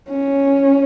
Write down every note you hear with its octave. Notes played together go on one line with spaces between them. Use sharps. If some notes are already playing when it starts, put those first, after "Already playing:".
C#4